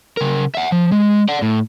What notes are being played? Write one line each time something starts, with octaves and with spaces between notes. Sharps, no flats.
C#3 A#4
E5 F#5
F3
G#3
D5 F#5
A2